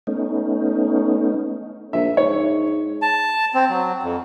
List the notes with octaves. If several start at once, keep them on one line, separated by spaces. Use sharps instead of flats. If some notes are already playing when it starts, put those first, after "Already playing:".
A3 B3 C#4 D#4
A#1 E5
G#2 C#5
A5
C4
F#3
F2